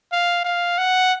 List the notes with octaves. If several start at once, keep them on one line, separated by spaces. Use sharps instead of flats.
F5
F5
F#5